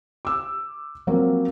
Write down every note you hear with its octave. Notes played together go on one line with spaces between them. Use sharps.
D6 E6
F3 F#3 A#3 C4